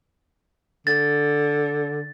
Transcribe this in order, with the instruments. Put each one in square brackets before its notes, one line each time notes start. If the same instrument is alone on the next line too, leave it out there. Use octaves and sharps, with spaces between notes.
[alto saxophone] D3 [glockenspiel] A6